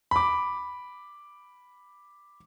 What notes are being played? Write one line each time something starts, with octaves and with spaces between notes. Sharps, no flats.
B5 D6